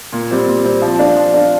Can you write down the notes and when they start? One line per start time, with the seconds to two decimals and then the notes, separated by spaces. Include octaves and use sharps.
0.13 A#2
0.31 G3 C4
0.47 A#2
0.65 G3 C4
0.82 F3
0.99 D4 F4
1.17 F3
1.34 D4 F4